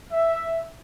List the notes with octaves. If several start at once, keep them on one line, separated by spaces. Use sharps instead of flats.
E5